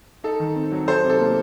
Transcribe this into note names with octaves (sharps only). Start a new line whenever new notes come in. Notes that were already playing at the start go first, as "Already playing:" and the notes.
D#4 A4
D#3
C4
F#3
D#4 A4 C5
C3
A4
A#3